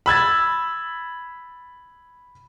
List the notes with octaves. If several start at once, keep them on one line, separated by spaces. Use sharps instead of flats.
B5 E6 G#6 A6